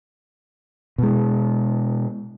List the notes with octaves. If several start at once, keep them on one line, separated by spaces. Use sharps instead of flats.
B2 G#3